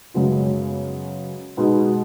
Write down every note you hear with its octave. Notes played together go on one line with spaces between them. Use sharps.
F#2 C#3 G#3 B3 F#4
B2 G#3 B3 D#4